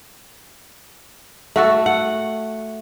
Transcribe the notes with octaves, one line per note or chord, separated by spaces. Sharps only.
A3 F#4 A4
F#5